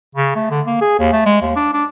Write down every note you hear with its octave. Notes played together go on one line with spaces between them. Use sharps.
C#3
A3
D3
A#3
G#4
D#2
A3
G#3
D#2
D4
D4